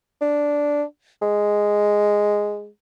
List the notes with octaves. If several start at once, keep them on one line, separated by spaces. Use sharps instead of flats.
D4
G#3